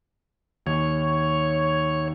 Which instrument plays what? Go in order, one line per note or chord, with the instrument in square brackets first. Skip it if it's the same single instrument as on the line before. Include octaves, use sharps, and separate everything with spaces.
[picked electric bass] D#2 [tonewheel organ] C#5